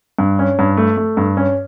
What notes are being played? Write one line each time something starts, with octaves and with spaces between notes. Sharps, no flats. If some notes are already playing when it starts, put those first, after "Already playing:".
G2
C#4
G2
A3
A3
G2
C#4